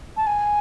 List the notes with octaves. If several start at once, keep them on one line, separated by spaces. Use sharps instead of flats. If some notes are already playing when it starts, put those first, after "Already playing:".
A5
G#5